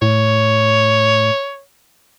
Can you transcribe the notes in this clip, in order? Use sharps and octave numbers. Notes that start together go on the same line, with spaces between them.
A2 C#5